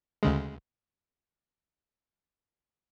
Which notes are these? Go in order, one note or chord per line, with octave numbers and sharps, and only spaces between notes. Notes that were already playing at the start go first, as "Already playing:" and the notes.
D2 C#3 G#3